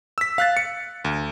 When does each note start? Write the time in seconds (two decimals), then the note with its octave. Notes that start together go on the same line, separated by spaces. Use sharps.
0.18 E6 B6
0.38 F5 F#6 A6
0.57 C#7
1.05 D2